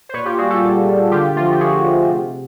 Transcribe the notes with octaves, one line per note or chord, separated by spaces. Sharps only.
C5
A#2 B4 C#5
F4 G4
G3 F#4 G#4
G4 A4
A#2
G3
D3 F4 G4
F3 A3 F4 F#4
G4
D3 F#4 G#4
F3 A3
C3